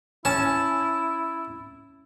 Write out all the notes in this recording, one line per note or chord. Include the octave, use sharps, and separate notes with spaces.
C#4 E4 A5